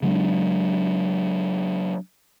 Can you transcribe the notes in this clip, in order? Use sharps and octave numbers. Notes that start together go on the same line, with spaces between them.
C#3 F#3 G#3 D4